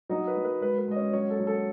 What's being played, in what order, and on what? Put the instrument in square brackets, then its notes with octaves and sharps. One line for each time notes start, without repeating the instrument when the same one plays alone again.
[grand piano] F#3 D#4 D#5
B4
F#3
B4
G#3 B4
B4
G#3 D#5
C#4 C#5
F#3 C#4 C#5
A4
F#3
A4